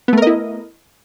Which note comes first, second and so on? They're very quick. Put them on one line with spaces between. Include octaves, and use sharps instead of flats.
B3 A3 A#4 D#5 E4